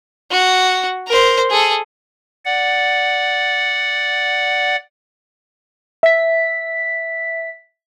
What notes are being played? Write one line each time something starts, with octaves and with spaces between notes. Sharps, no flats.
F#4
A#4 C5
G#4 A4
D5 F#5
E5 B6